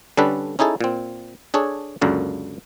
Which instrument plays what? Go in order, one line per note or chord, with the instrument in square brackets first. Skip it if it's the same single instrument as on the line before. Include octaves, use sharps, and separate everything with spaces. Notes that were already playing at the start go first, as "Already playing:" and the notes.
[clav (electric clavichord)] D3 G3 C#4 D4 A4 B4
C#4 D#4 E4 G#4 A4
A#2 C4
D4 G#4 A4 C#5
C#2 F#2 D3 A#3